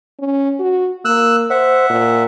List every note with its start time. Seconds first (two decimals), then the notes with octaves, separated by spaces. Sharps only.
0.19 C#4
0.59 F#4
1.05 A#3 E6 F#6
1.50 C5 E5 F#5
1.90 A#2